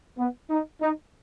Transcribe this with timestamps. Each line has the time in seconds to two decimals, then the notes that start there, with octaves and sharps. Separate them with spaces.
0.18 B3
0.50 D#4
0.81 D#4